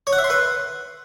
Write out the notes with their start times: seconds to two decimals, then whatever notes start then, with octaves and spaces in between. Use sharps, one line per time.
0.07 C#5
0.13 F#5
0.18 E5
0.24 C6
0.30 B4